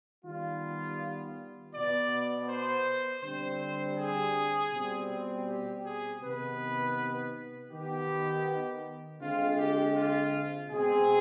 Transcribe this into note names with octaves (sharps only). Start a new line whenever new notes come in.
D#3 G3 B3 F4
B2 B3 D5
C5
D3 G3 C4 C5
C5
G#4
B2 G3 C4
G4
G#4
C3 D#3 B3 B4
D#3 B3 G4
D3 G#3 C4 F4
G4
F4
B2 G#3 C4 G#4